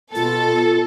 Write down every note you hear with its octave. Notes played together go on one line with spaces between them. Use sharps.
B2 F4 A4 A6